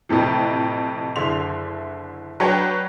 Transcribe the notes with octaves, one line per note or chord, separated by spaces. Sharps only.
F2 A2 C3 E3
F#1 D3 E4 C6 F7
F#3 D4 B4 C#5 G5